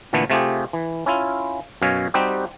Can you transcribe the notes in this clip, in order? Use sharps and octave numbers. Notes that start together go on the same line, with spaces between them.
A#2 D3 E3 A3 B3
C3 A3 F4 G4 G#4
E3
C#4 E4 F4
F#2 B2 C#5 F5 G#5
G3 C4 D#4 F#4 G4